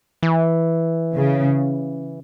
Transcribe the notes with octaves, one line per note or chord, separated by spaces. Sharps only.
E3
C#3